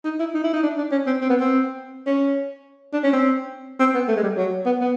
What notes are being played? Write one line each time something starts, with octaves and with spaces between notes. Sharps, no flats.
D#4
E4
D#4
E4
D#4
D4
D4
C#4
C4
C4
B3
C4
C#4
D4
C#4
C4
C4
B3
A3
G#3
G3
F#3
B3
B3